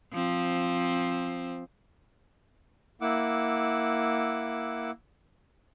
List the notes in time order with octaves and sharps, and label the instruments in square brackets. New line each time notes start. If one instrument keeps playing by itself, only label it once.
[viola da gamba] F3 C4
[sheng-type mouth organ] A#3 E4 F#5 D6 E6